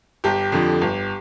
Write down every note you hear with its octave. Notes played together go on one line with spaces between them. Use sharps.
G1 G4
F2 D3 F3
G1